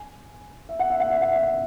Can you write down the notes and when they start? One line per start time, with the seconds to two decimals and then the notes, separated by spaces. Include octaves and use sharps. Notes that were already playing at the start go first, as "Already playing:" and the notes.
Already playing: G#5
0.69 E5
0.79 F#5
0.90 E5
1.00 F#5
1.10 E5
1.21 F#5
1.31 E5